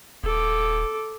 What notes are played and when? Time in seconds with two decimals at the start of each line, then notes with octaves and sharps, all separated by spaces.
0.24 D#1 A4 D6